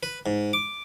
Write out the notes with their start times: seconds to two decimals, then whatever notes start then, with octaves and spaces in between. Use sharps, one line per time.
0.03 B4
0.26 G#2
0.53 D6